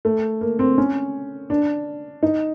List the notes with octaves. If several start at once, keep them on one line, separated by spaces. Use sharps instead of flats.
A3
A#3
C4
C#4
D4
D#4